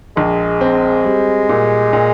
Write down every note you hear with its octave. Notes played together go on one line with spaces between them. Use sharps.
A#1 G#3
C4
G3
A#2
A#2